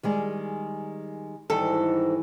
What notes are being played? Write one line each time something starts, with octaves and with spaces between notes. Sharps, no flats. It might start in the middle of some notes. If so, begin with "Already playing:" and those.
D#3 G3 G#3
G#2 D#3 E3 G3 A4